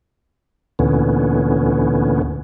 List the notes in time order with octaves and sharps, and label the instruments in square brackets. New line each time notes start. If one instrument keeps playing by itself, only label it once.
[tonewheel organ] D2 A#2 D3 E3 B3 C#4